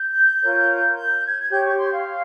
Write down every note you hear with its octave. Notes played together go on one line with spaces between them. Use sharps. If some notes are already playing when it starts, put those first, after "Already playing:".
Already playing: G6
F4 A#4 C#5
G6
G#6
G#6
G4 C#5 G6
C#6
C6
F5